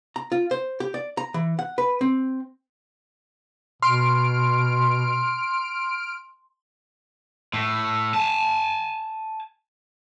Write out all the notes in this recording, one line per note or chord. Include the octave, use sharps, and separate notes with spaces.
A#5
F4
C5
G4
D5
A#5
E3
F#5
B4
C4
B2 C6 F6 D7
A2
G#5 A5